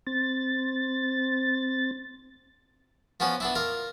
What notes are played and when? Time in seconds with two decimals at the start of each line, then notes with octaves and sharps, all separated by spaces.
0.07 C4 A6
3.20 F3 B3 C#4 F#4
3.40 B3 D4 E4
3.55 F4 A#4